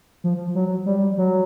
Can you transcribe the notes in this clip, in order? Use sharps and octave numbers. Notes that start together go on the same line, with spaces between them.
F3
F#3
G3
F#3